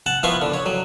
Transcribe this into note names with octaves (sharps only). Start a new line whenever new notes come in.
F#5 A5
F3 B3 E4 F5 C6 C#6
D3
C#5
F#3